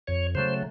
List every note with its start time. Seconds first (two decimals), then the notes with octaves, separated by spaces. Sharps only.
0.07 F2 C#5
0.35 C#3 F#3 A3 C5